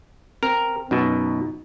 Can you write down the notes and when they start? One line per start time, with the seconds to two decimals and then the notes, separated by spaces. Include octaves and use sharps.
0.43 C4 A#4
0.91 F#2 B2 D#4